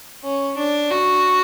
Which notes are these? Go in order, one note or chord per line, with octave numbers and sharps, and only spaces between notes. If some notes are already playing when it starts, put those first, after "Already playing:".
C#4
D4
F#4